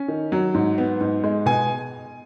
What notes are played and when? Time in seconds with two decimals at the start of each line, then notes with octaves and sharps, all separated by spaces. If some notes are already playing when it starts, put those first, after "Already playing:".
Already playing: C#4
0.08 D#3
0.32 F#3
0.54 G#2
0.78 B3
1.01 G#2
1.24 G#3
1.46 B2 G#5